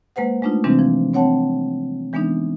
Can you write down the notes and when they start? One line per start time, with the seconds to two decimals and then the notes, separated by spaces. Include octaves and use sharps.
0.16 G#3 A#3 B4 C5 F#5
0.42 G#3 A3 D4 D#4 F4
0.64 C3 E3 G3 G#3 C4 D4
0.79 F3
1.14 C4 C#5 F#5 G5 A5
2.13 E3 G#3 B3 D4 D#4